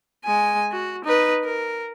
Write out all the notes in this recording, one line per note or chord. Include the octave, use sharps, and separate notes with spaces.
G#3 G#5
F#4
D#4 B4
A#4